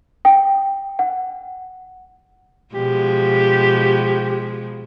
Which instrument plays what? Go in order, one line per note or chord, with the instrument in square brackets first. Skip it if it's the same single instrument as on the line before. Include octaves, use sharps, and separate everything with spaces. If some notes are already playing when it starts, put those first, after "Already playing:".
[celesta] G5
F#5
[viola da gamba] B2 F3 G#3 [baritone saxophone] G4